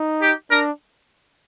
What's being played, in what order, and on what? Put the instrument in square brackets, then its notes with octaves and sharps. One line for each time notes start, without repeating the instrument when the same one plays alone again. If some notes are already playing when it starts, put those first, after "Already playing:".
Already playing: [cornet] D#4
[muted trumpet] G4
[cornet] D4 [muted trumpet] A#4